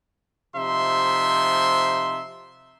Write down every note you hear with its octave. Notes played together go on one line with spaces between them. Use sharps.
C3 F3 D#4 E5 C6